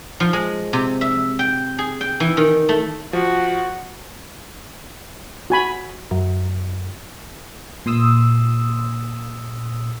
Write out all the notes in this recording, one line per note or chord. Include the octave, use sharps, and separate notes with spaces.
F3
G#3
C3
E5
G5
G#4
G5
E3
D#3
A3
F3 F#4
F#4 G#5 B5
F#2
A#2 C6 D#6 E6